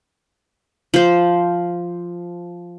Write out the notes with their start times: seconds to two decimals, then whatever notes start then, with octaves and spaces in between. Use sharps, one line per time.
0.94 F3 C5